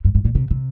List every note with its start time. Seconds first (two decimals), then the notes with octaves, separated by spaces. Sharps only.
0.05 G2
0.15 G#2
0.25 A#2
0.35 C3
0.51 C3